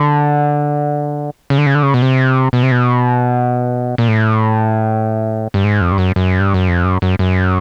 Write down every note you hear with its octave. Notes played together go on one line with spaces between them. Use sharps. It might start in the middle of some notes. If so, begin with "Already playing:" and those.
Already playing: D3
C#3
D3
C#3
D3
C#3
B2
C3
B2
C3
B2
A#2
A2
G2
G#2
F2
G2
F#2
F#2
G2
F#2
F2
F#2
F#2
F#2